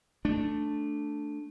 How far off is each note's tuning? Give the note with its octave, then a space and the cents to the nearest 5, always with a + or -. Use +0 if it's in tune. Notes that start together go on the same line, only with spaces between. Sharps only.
A3 +0 D4 +0